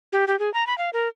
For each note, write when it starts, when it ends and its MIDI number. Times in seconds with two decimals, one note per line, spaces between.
0.12 0.25 67
0.27 0.38 67
0.39 0.52 68
0.54 0.66 82
0.67 0.76 83
0.78 0.90 77
0.93 1.08 70